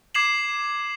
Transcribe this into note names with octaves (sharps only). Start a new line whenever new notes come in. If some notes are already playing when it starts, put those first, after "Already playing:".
D6 G#6 C7 E7 F#7